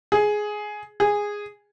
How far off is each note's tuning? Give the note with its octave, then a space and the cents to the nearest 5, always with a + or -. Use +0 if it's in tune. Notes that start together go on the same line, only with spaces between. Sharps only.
G#4 +10
G#4 -10